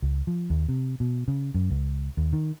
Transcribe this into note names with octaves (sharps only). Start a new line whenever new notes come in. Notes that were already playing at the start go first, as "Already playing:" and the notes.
C#2
F3
D#2
C3
B2
C#3
F#2
C#2
D#2
D#3